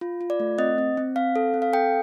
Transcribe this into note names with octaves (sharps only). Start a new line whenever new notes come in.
F4
F4
D5
A3
C4 D#5
C4
C4
C4 F5
A4
C4
F5
A4 G5